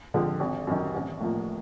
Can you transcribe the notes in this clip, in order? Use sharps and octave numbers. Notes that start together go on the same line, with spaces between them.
D3 F3 G#3 C4
G#1
F#2 D#3
A1
A2 F3 A#3